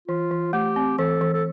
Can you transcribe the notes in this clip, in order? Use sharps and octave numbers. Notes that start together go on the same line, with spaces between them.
E3 F4
E3
A3 G4
C4
E3 A4
E3
A4